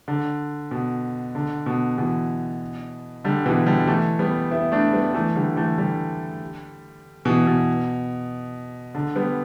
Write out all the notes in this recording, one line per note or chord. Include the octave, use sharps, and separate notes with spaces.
D3
B2
D3
B2
B2 E3
D3 G3
B2 E3
D3 G3
E3 A3
G3 B3
B3 E4
A3 D4
G3 B3
E3 A3
D3 G3
E3 A3
D3 G3
B2 E3
B2
D3
G3 B3